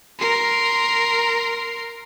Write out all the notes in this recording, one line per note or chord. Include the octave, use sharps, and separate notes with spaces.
A#4 C6